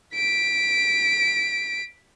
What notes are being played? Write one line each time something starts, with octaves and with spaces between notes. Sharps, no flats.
B6 D7